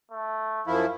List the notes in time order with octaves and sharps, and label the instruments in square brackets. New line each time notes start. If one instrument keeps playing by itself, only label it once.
[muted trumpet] A3
[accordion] F#2 F3 E4 [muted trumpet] F5